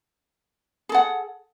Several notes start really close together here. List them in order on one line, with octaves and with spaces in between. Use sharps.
G#4 A4 F#5